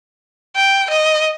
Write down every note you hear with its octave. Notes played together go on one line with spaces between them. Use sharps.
G5
D#5